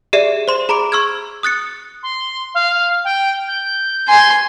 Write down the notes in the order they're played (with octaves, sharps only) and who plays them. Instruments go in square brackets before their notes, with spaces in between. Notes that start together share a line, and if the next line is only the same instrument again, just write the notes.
[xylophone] G4 G#4 D5 E5 C7
C5 C6 E7
G#4 A#5 B5 D6 D7
C#6 E6 F6 G#6
D#6 F#6 A6 C#7
[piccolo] C6
F5
G5
G6
[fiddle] G#5 C6